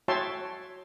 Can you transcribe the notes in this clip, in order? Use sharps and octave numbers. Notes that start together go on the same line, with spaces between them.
F#4 C#5 E5 G5 A5 C6